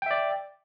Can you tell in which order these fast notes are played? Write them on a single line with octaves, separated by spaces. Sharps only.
G5 E5 D5